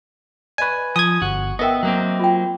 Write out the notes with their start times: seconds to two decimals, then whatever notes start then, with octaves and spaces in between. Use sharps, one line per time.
0.58 B4 D5 D#5 G#5 C#6
0.96 F3 G#5 D#6 G#6
1.22 G1 F#4
1.59 B3 D#4 A#4 D#5 E5 G5
1.83 F#3 A#3 C4
2.19 F4 G5